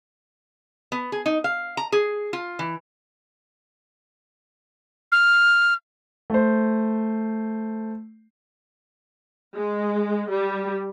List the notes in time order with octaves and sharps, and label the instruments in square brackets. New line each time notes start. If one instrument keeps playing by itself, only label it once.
[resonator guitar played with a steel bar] B3
G#4
D#4
F5
A#5
G#4
F4
E3
[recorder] F6
[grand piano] A3 C5
[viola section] G#3
G3